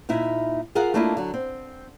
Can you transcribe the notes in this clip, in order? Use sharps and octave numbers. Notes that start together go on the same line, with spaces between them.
A#2 D#4 E4 E5
F4 G#4 A#4 F5 F#5
A3 A#3 D4 E4 F4 D#5
D3 F#3
C4